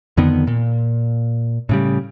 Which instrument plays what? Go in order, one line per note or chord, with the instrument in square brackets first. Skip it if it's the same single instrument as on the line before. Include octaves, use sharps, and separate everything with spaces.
[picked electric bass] F2 D3 D#3 B3
A#2
A2 C#3 G3